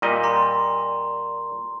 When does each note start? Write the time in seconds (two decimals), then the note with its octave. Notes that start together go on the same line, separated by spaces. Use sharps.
0.02 A#2 G3 D#5
0.23 A#5 C6